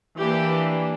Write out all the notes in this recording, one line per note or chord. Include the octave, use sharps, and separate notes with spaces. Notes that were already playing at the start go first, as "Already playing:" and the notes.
E3 A#3 D4 G4